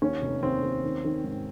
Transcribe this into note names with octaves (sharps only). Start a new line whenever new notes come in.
D#2 C#4
F1
D#2 C4
D#2
D#3
D#3
G#2